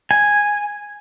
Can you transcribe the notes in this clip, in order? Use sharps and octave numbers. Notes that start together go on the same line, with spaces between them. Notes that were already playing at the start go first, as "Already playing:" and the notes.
G#5